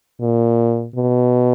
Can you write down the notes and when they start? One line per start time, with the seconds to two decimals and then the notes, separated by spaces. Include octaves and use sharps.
0.21 A#2
0.95 B2